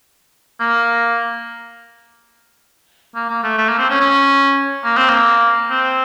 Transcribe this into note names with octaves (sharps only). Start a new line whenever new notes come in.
A#3
A#3
A#3
A3
A3
A#3
C4
C#4
C#4
A#3
C4
A#3
C4